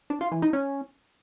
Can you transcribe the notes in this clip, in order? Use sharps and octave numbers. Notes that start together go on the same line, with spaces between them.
D4
F4
E3
D#4
C#4